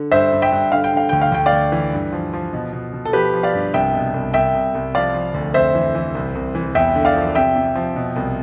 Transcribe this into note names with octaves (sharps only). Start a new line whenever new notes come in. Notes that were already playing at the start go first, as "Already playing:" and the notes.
Already playing: D3
G2 C5 E5
G2
E5 G5
G2
D3 F5
G5
D3 F5
D2 G5
F5
D2 G5
D5 F5
D2
E3
G2
F3
F3
B2
B2
B2
A4
F3 G4 B4
F3
D5 F5
G2
C2 E5 G5
B2
C2
C2 E5 G5
C2
C2
F3 D5 F5
F3
D2
F2 C5 E5
E3
E3
C2
C2
E3
E2 E5 G5
D3
D5 F5
F3
C3 E5 G5
C3
F3
B2
C2